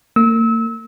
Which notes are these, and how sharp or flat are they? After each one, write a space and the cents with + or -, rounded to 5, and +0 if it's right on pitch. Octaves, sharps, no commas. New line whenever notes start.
A#3 -40 E6 -30